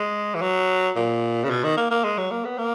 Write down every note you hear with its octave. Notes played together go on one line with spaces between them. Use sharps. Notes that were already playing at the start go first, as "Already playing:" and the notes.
Already playing: G#3
E3
F#3
A#2
C#3
B2
D#3
A#3
A#3
G#3
F#3
A#3
B3
A#3